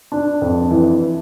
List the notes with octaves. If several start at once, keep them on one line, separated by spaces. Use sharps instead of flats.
D4
F2
E3